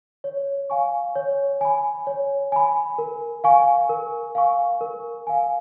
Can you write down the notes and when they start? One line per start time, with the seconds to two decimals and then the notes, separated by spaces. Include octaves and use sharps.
0.24 C#5
0.70 F5 G#5 C#6
1.15 C#5
1.61 G#5 B5
2.07 C#5
2.52 G#5 B5
2.98 A#4
3.44 F5 G#5 C#6
3.89 A#4
4.35 F5 G#5 C#6
4.81 A#4
5.27 F5 G#5